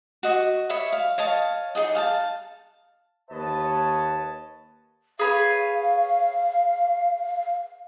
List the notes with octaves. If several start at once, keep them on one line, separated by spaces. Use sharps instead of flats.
F#4 D#5 C#6
C#5 D#5 E5 B5
F5
C#5 D#5 F5 A5
D#4 F#4 G#4 D#5
F5 G5 A5
D#2 B4 C#5 D#5 A5
G#4 B4 C#5 F5